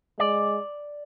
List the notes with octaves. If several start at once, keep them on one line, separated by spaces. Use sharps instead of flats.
G#3 D5